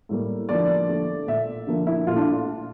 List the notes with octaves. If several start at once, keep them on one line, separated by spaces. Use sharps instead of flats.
A2 G3 A#3
D3 F3 A#3 D5
D3 A3
A#2 A3 E5
D3 F3 A#3
E4
A#2 A3 F4
D4